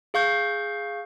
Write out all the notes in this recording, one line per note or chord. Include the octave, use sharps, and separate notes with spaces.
G#4 F5 C#6 G6